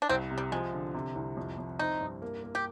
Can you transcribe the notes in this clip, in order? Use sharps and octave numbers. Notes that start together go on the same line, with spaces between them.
D4
C2 C4
C3
G3
F3 G#3
D3
C3
C2
F2
F2
C4 D#4
G2
A#3
A#3
G4